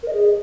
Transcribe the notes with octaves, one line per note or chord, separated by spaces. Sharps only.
A#4
D#5
G#4